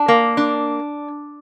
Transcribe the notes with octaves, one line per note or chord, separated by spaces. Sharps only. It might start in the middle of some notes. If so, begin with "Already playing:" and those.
Already playing: D4
A#3
D4